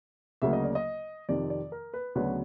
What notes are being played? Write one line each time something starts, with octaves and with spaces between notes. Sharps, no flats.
D2 C#3 F#3 A#3 E5
D#5
D5
D#5
F2 C3 D#3 D5
D5
A#4
B4
D2 C#3 F#3 B3 D4 B4